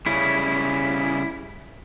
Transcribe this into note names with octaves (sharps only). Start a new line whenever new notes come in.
C#3 G3 C#4 E4